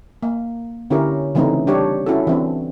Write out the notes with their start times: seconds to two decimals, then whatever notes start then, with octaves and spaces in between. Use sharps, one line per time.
0.23 A#3
0.90 D3 C#4 E4 G4 A#4 C#5
1.35 C#3 E3 A3 C4 C#4 D#4
1.67 G3 D4 G4 C#5
2.06 C#4 E4 F#4 A4
2.27 E3 C4 D4